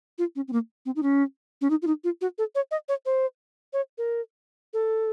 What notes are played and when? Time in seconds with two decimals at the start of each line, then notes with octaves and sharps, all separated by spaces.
0.18 F4
0.36 C#4
0.48 C4
0.53 A#3
0.86 C4
0.96 D#4
1.03 C#4
1.61 C#4
1.70 D#4
1.82 F4
1.87 D#4
2.04 F4
2.21 F#4
2.38 A4
2.55 C#5
2.71 D#5
2.89 C#5
3.06 C5
3.73 C#5
3.98 A#4
4.74 A4